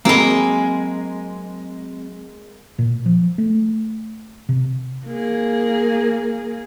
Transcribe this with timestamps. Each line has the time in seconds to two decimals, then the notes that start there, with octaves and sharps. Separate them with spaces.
0.05 F#3 G#3 A#3 C4 B5
2.78 A#2
3.06 F3
3.38 A3
4.49 C3
5.07 A#3 G#4